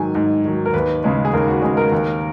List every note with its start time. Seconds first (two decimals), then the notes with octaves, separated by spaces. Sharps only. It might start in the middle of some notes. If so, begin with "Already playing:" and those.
Already playing: G#2 D#3 F#3 G#5
0.15 G#2
0.45 D#3 F#3
0.66 A#4
0.73 D#2 B4
1.04 C#3 G#3
1.25 G#4
1.33 D#2 A#4
1.48 F#4
1.62 C#3 G#3 G#4
1.77 A#4
1.92 D#2